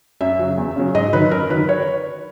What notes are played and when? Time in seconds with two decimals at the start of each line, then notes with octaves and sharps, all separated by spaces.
0.21 F#2 E5
0.39 C#3 F#3
0.58 E2
0.76 C#3 F#3
0.95 G#2 D#5
1.13 D#3 F#3 B4
1.31 F#2 A#4
1.50 D#3 F#3 B4
1.69 C#5